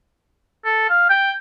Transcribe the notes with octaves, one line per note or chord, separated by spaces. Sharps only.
A4
F5
G5